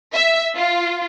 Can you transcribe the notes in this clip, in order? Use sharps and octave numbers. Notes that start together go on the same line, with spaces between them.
E5
F4